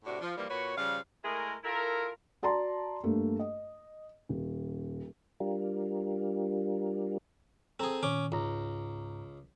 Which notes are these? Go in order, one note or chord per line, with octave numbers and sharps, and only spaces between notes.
A2 C3 D4 F#4
F3
E3 F3 G3 A#3
A#2 F#4 B4 C#5
C#3 F3 G3 F5
G#3 A3 E4 G#4 A#4
E4 F4 A4 A#4
F#4 D5 A5 A#5 C6
G2 A3 A#3
D#5
D#1
G3 D4 F4 G4 A#4
C4 G#4 A4 A#5
A#2 D#3 C#4 D6
C#2 G#2 A#5